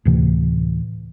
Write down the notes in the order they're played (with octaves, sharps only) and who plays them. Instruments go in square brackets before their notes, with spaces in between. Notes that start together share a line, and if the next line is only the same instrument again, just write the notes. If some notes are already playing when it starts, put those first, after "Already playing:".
[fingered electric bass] D2 A2 C3 E3